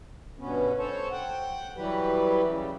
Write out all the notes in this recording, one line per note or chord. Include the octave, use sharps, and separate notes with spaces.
G2 B2 B3 C#4
A4 C5 C#5
F#5 G5
E3 F#3 G3 G4 B4
C#3 G3